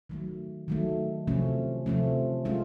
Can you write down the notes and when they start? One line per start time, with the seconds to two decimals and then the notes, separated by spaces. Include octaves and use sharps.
0.10 D#3 F#3 A3
0.68 D#3 F#3 A3
1.27 C3 F3 A3 C#4
1.86 C3 F3 A3 C#4
2.45 G#3 C#4 F4